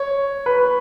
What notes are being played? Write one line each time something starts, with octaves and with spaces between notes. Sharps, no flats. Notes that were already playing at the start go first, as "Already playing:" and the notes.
Already playing: C#5
B4